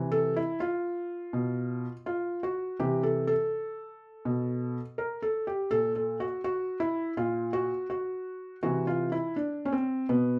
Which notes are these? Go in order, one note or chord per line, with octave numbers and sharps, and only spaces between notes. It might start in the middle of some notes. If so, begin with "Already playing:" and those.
Already playing: C3 E3
A4
E4
F4
B2
F4
F#4
C3 E3 G4
A4
A4
B2
A#4
A4
G4
A#2 A4
A4
F#4
F#4
E4
A#2 F4
F#4
F#4
C3 E3 F#4
F4
E4
D4
C#4
C4
B2 B3